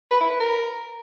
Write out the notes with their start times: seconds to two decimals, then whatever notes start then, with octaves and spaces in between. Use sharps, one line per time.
0.11 B4
0.21 E4
0.30 B4
0.40 A#4